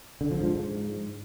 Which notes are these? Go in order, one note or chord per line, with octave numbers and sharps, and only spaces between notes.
D3
F3
G#2